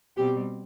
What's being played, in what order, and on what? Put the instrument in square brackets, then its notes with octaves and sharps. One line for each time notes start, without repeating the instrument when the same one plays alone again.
[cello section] B2 G3 C4 G4